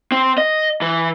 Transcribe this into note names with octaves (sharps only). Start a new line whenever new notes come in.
C4
D#5
E3